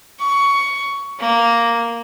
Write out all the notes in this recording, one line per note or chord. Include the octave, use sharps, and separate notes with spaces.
C#6
A#3